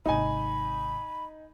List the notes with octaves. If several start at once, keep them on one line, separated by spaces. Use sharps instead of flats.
G#1 C3 D#4 G#5 B5